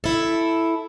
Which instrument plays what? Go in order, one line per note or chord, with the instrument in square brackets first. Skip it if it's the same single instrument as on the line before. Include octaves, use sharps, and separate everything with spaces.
[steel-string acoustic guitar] E4 A4